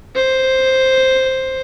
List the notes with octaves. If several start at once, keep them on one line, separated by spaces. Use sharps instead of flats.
C5